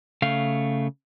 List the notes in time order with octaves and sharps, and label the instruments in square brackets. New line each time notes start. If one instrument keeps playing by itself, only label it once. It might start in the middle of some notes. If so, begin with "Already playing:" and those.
[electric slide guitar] C#3 A3 F5